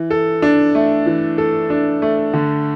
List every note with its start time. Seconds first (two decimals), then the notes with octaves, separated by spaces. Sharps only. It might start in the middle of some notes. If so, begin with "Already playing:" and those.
Already playing: E3
0.10 A4
0.42 D4
0.75 A3
1.06 E3
1.38 A4
1.70 D4
2.02 A3
2.34 D3